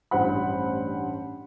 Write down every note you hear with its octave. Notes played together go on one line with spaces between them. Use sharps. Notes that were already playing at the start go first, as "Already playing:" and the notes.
A1 G2 C5 F#5 B5